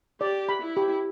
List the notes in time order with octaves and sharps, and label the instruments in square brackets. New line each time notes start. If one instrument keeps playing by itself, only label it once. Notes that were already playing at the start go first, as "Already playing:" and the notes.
[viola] G4 [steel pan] D5
[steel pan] B5
[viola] E4
[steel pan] G4